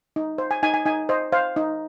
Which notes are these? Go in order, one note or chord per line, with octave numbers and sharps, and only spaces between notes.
D#4
C5
G#5
D#4 G#5
G#5
D#4 G#5
C5 D#5
C5 F5
D#4